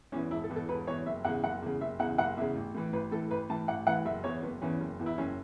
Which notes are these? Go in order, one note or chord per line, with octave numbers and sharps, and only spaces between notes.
E2 E3 C#4
E1 E4
A4
E2 E3
A4
E1 B4
E2 E3 C#5
F#1 E5
E2 C#3 F#5
F#1 F#5
E2 C#3
F#1 E5
E2 C#3 F#5
F#1 F#5
E2 C#3 E5
A1
A2 E3
A1 B4
A2 E3 A4
A1 B4
A2 E3 A5
A1 F#5
A2 E3 F#5
F#1 E5
E2 E3 C#5
F#1 B3
E2 E3 C#4
F#1
E2 E3
E4
F#1 C#4